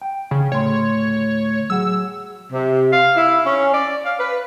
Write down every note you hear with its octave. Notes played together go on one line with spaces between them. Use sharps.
G5
C#3
D2 A2 C#5 C6
F#3 G#4 F#5 E6
C3
F5
E4
C#4
D5
F5
B4